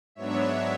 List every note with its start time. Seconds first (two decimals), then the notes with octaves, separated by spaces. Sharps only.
0.15 G#2 F#3 B3 D4 C#5 E5